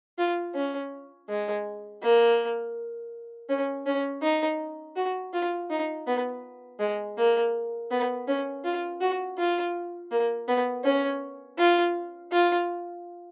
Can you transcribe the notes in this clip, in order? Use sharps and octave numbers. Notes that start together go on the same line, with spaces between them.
F4
C#4
G#3
A#3
C#4
C#4
D#4
F#4
F4
D#4
B3
G#3
A#3
B3
C#4
F4
F#4
F4
A#3
B3
C#4
F4
F4